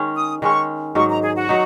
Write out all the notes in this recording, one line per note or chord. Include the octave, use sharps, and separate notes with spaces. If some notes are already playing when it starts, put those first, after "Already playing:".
Already playing: D#3 G#3 C#4
D#6
D#3 G#3 C#4 C#6
G#2 F#3 D#4 C#6
A#5
G#4
F#4
F#3 D#4